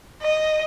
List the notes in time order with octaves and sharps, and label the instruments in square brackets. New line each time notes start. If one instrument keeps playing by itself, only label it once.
[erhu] D#5